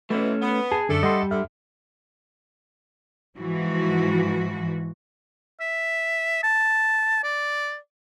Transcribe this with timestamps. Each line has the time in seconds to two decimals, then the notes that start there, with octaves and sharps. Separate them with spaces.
0.10 B2 E3 A3 C#4
0.42 B3
0.71 G#4 A5
0.89 F#2 D3 A3 D4 A4
1.03 G3 D#5 F#5 C6
1.31 D3 E5 F6
3.38 G#2 E3 F3 F#4
5.61 E5
6.43 A5
7.23 D5